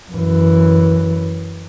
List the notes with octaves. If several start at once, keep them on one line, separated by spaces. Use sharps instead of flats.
F#2 E3